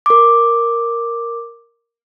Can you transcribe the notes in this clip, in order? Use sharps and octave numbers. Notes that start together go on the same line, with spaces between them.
A#4 D6